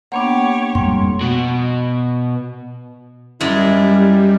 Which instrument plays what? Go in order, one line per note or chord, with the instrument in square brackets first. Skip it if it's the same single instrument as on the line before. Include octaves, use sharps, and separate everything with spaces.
[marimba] A#3 B3 D4 [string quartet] G4 C#5 [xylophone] F#5
[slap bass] F2 [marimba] G3 G#3 A#3 [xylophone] C6
[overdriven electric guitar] B2 F#4
[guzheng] F#2 G#3 [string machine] G3 [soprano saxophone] E4